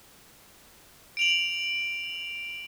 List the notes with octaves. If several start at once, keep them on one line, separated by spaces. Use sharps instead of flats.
D7 F7 F#7